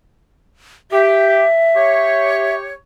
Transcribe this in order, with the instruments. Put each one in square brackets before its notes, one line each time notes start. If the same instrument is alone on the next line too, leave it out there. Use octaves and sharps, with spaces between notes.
[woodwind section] G4 [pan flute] E5
[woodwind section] G4 C#5